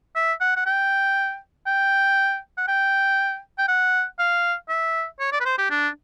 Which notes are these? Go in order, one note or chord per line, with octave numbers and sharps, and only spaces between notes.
E5
F#5
F#5
G5
G5
F#5
G5
G5
F#5
F5
E5
C#5
D5
B4
C5
G4
D4